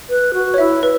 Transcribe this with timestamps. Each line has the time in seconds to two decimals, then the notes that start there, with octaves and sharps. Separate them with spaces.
0.09 B4
0.34 F#4
0.54 C#5
0.58 E4 E5
0.83 B4